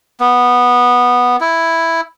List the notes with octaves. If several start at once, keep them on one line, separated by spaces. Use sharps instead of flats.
B3
E4